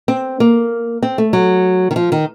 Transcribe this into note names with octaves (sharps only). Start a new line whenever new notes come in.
C4
A#3
C4
A3
F#3
D#3
F3
D#3